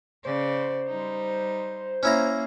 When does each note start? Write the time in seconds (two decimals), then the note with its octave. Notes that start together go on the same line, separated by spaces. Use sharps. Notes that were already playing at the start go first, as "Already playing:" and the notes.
0.25 C#3 C5 D5
0.89 G3 D#4
2.03 A#3 C#4 E4 A#5